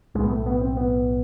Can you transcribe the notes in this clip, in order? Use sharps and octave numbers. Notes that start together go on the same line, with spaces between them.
B1 A2 G#3
B3
A3
B3
C4
B3